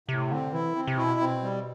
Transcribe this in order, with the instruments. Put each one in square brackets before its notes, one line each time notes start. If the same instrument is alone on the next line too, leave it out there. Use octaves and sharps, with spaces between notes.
[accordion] A2 [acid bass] C3
[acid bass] D3 [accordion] C4
[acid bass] E3 [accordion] E4
[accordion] C4
[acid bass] C3
[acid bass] B2 [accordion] E4
[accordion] C4
G3